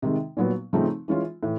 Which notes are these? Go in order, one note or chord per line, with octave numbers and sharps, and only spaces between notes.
C3 D#3 G#3
A#2 F#3 B3
C#3 F3 A3 C4 D#4
E3 G#3 C#4 F4
A2 E3